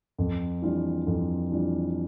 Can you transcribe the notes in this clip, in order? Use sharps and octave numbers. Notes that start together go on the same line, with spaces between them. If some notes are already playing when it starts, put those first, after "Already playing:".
F2
E3 G3 D4 F4
F2
E3 G3 D4 F4